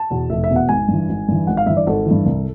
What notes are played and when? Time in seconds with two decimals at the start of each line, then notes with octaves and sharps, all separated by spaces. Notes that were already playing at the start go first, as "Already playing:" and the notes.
Already playing: A5
0.10 E2 B2
0.30 F1 E5
0.44 E5
0.50 E2 B2
0.56 F#5
0.69 G#1 G#5
0.88 G2 E3
1.09 G#1
1.28 G2 E3
1.47 G#1 F#5
1.57 F5
1.66 G2 E3 E5
1.77 D5
1.87 G#1 A4
2.06 E3
2.11 G2
2.26 C2